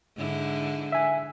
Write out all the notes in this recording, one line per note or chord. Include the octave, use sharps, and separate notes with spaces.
G#2 D3 E4
E5 G#5